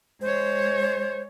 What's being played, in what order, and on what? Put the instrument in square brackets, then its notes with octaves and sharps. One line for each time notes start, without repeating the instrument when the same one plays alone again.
[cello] G#3 C#5 [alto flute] C5